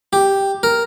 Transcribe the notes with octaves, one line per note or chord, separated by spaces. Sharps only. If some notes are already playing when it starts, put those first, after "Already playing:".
G4
A#4